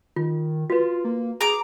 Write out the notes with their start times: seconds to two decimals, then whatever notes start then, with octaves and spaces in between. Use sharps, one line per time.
0.16 D#3 F4
0.70 F4 F#4 B4
1.05 A#3
1.41 G#4 A#5 D6